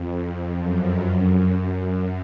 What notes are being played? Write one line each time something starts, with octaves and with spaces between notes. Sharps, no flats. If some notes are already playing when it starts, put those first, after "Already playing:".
Already playing: F2
F#2
F#2
F#2